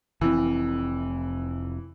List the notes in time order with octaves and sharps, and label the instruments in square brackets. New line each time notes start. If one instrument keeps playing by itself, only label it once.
[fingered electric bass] F1 C4 [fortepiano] E3